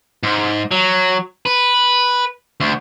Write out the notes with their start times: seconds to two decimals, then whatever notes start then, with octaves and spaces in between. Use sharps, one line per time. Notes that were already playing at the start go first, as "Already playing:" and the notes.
0.23 G#2
0.71 F#3
1.46 B4
2.60 D2